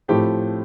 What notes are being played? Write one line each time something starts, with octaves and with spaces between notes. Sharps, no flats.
A2 F3 A3 C4 G4